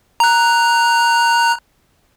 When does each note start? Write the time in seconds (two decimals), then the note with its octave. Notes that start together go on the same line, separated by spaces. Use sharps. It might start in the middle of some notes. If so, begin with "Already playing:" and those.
0.20 A#5 F#6